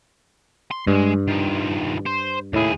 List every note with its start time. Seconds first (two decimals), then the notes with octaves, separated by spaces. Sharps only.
0.71 C6
0.87 G2 G#3
1.28 D#3 F3
2.06 C5
2.53 D#2 A2 E4 G#4